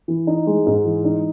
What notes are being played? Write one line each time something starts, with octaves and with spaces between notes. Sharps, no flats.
E3
D#4
G#3
G#2
E3
D#4